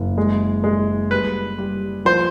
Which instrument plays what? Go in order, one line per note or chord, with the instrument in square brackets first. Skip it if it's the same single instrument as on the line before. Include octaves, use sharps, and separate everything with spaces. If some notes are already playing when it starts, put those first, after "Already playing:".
Already playing: [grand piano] F#1
G#3
G#3
[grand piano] G3 [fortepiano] B4
[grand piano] G3
[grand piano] F3 [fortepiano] C5